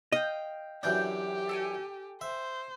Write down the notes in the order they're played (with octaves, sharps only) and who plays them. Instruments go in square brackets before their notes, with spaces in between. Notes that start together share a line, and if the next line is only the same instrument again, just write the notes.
[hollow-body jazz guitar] D#5 [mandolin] F5 G5
[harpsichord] F#2 E3 D4 [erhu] G4 [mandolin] G5 G6
[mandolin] A4 G5 G#5
[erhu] C5 [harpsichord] E5